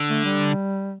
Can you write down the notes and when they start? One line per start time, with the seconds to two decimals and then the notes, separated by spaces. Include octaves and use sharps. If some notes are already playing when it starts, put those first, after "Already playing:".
Already playing: D3
0.09 A3
0.25 G3